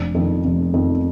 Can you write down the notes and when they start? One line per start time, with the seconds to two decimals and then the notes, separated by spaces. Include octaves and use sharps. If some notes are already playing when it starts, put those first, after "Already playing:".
Already playing: F1 D4 D5
0.15 F2 D#3
0.44 F1
0.74 F2 D#3